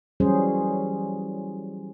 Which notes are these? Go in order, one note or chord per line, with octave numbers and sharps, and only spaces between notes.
E3 F#3 G3 C#4 G#4 C5